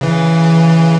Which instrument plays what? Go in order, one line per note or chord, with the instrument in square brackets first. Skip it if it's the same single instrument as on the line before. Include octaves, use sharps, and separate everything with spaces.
[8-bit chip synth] C#3 E3